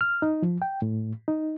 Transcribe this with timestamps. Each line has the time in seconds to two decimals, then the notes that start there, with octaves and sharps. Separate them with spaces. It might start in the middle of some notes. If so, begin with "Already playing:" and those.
0.01 F6
0.22 D#4
0.42 F3
0.62 G5
0.82 A2
1.28 D#4